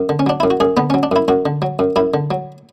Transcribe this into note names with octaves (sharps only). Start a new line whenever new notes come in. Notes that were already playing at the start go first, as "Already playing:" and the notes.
Already playing: F#2
D3
C#4
F#3 D4
F#2 E4
F#4
F#2 G#4
D3 B3
F#3 C#4
D4
F#2 E4
F#2 F#4
D3
F#3
F#2
F#2 E4
D3
F#3